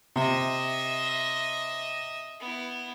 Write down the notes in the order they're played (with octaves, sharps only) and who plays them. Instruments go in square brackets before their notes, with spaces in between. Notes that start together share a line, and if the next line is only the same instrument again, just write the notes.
[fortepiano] C3 [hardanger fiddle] D#5 E5
[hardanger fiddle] B3 E4